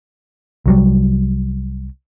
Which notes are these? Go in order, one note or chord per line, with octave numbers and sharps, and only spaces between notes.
C2 F#3 G3